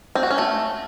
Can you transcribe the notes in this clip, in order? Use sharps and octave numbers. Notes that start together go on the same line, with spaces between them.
C4
F#4
C#4
A3